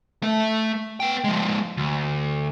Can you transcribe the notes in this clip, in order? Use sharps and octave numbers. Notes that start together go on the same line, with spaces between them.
A3 E5
B3 G5
F3 G#3
D2